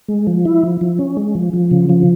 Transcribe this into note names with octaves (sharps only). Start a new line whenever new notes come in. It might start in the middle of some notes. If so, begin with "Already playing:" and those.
G#3
F3
E4
F3
F3
C#4
G#3
F3
F3
C#3
F3